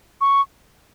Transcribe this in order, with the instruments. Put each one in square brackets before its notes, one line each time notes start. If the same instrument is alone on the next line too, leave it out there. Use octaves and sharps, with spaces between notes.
[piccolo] C#6